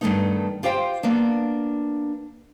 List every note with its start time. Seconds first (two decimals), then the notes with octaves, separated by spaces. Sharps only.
0.01 G2 D#3 F3 A3 B3 D#4
0.63 F4 G4 C5 F5 G5
1.03 A#3 B3 D4